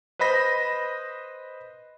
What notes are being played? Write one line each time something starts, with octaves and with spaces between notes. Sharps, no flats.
B4 C5 D#5 B5 A#6